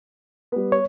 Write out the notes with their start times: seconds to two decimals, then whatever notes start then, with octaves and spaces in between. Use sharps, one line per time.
0.52 G3 B3
0.72 C#5